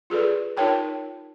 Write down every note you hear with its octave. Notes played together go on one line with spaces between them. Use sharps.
F4 G#4 A4 B4 D5
D#4 F4 A#4 C#5 G5 A5